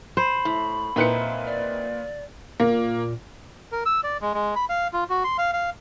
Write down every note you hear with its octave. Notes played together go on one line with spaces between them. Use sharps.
C5 B5
A2
A#2 C4 D#4 E4 B4 C#7
D5
A#2 A#3
A#4
E6
D5
G#3
G#3
B5
F5
F4
F#4
C6
F5
F5